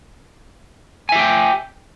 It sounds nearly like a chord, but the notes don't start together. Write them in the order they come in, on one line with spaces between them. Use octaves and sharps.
G#5 E5 G4 G5